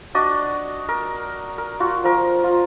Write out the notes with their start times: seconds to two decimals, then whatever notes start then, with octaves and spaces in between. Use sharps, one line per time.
0.15 D4 F#4 D5 D#5
0.89 A#4
1.58 A#4
1.80 F4 F#4
2.04 F3 A#4
2.44 F4